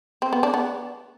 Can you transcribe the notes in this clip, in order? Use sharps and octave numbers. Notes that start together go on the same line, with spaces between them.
C4
B3
D4
B3